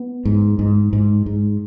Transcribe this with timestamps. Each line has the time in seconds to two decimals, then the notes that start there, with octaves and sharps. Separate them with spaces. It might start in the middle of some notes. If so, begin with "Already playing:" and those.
Already playing: B3
0.25 G#2
0.59 G#2
0.93 G#2
1.26 G#2